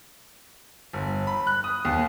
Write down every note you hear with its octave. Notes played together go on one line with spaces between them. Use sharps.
G1
B5
F#6
D#6
D#2